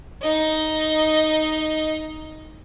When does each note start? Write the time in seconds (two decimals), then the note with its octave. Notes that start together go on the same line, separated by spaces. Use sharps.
0.22 D#4 D#5